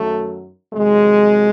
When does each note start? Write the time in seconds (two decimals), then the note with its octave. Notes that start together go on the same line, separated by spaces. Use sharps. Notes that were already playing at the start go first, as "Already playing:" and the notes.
Already playing: F#2 D#3 F#3 A3
0.73 F2 C3 D#3 F#3 G#3